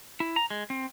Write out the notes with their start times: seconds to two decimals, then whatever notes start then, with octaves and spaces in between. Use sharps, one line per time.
0.20 E4
0.36 A#5
0.50 G#3
0.70 C4